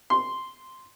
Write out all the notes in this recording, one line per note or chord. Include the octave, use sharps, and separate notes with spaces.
C6